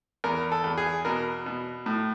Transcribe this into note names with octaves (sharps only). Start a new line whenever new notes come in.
E2 A#4
A4
E2
G#4
B2 A#4
B2
A2